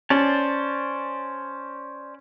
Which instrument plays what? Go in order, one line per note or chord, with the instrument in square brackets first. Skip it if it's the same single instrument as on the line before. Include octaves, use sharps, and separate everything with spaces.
[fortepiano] C#4 [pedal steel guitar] C5 D5 A5